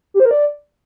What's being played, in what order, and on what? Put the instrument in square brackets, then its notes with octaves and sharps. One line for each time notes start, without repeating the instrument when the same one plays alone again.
[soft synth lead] G4
C5
A#4
D5